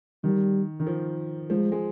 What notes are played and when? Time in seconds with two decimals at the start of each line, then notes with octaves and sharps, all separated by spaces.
0.24 D#3 G3
0.80 D#3
0.87 F3
1.50 F3 G#3
1.72 G#3